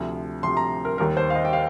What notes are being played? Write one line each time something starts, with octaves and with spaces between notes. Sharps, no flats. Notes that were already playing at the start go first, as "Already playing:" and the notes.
Already playing: D2 C3 F3
D2 C3 F3 C6
A#5
A#4
D#2 D#3 G3 A#4
C5
F5
D#5
G5
F5